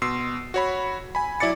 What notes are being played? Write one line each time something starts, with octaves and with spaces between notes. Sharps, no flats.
B2 C6 E6 C7
F#4 C#5 B5
G#5 B5
F#3 E4 D5 D6 A6 C#7